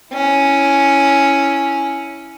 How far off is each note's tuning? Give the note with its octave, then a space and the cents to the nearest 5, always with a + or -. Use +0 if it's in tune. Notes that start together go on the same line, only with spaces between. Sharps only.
C#4 +0 E4 +0